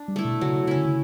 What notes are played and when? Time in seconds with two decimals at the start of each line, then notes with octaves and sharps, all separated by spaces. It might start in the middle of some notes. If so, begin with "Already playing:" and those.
Already playing: D4
0.08 G3
0.16 A3 E4
0.25 B2
0.41 C#3 F#3
0.67 C#3 C#4 E4
0.76 D3
0.85 C#3